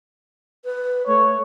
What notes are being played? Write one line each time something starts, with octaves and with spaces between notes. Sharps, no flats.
B4
A3 C#5